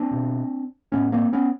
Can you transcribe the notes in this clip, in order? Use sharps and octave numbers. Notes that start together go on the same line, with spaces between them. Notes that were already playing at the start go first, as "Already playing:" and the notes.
Already playing: C4 D4
B2
A2 B3 C#4
A#3 C4
B3 C#4